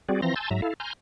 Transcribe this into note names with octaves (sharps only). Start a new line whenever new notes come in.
G3 C4 F#4 G#4 D5
E3 F3 C4 A#5 C6 A#6
G#5 A5 C6 E6 G6 A6
G#2 F#3 E5 A#5
E4 A4 F5
G#5 A#5 C6 F6 G6